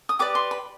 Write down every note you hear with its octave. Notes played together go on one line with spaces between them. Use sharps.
D#6
G4 B4 D5 D6
C6
B5